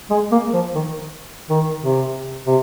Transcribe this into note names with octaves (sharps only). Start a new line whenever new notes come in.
G#3
A#3
F3
D#3
D#3
C3
C3